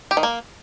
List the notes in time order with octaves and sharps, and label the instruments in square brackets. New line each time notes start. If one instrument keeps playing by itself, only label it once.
[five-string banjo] G4
D#3
A#3